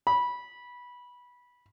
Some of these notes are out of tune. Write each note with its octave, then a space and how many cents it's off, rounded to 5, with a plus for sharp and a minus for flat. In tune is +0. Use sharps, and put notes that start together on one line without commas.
B5 -15